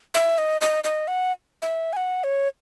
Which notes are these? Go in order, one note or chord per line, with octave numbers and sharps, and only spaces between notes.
E5
D#5
D#5
D#5
F#5
E5
G#5
F#5
C#5